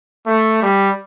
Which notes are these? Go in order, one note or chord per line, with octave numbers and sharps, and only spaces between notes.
A3
G3